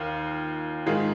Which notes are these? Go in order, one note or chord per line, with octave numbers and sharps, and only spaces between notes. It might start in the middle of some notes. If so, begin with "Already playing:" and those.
Already playing: D#2 F4
G#2 D#3 G#3 F4